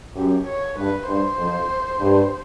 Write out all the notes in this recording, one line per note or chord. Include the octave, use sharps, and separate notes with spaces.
F#2 G4
C#5
G2 B4
G2 C5
F2
G2